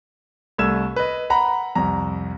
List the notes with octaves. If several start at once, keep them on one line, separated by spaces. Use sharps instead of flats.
C2 A3 E6 G#6 E7
B4 D#5
F#5 A#5 B5
C2 F2 A#5